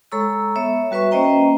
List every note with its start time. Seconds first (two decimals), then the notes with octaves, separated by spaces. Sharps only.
0.12 G#3 A4 C#5 A#5 C#6 E6
0.56 B3 C#5 E5
0.91 G3 F#4 B4 E5 C#6
1.11 A#3 C#4 C5 D#5 G5 A#5